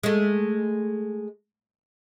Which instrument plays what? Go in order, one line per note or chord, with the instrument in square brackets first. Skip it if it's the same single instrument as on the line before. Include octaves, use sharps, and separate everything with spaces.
[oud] G#3 A3